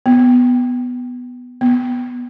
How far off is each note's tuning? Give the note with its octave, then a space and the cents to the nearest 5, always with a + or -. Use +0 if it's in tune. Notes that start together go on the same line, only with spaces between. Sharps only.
B3 +5
B3 -5